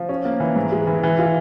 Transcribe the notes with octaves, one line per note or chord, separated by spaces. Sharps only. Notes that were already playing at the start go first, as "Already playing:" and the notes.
Already playing: F3
C#4
A#3
E3
G#2
G#3
E3
E3
F4